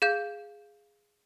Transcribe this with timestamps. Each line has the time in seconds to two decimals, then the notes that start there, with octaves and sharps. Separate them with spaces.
0.02 G#4 F5 G6